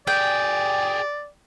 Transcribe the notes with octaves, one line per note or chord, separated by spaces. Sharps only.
G4 G#4 D5 G5